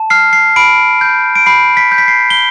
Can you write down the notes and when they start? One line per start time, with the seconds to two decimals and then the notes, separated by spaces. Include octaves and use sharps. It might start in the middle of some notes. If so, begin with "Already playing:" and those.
Already playing: A5
0.10 F6 C7
0.33 C7
0.56 B5 D7
1.01 G6
1.36 D7
1.46 B5 C7
1.77 B6
1.92 G6
1.98 B6
2.08 C7
2.30 G7